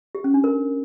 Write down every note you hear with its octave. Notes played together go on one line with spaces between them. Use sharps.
G4
C#4
D4
A#4